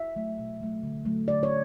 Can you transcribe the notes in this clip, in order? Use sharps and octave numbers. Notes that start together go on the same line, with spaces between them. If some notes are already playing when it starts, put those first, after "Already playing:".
Already playing: E5
F#3 A3
B2
F#3 A3
D3
F#3 A3
D3 D5
C#5